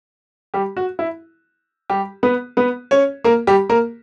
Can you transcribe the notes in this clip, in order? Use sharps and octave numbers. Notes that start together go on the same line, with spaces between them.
G3 G4
F#4
E4
G3 G4
B3 B4
B3 B4
C#4 C#5
A#3 A#4
G3 G4
A#3 A#4